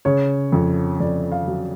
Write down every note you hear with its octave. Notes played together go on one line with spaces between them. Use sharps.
C#3 C#5
F2
F2 D5
F5
F#3